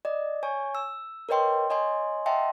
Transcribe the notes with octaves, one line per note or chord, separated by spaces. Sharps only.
D5 D#5
C#5 G#5 C#6
E6
A#4 B4 C#5 D#5 G5 C6
C#5 D#5 G#5 C6
D#5 E5 F#5 G5 A5 C6